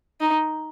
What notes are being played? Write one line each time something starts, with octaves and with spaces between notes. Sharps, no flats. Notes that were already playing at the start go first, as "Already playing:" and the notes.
D#4